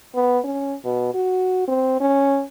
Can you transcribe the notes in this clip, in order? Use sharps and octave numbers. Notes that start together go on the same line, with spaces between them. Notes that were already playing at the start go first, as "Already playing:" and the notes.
B3
C#4
B2
F#4
C4
C#4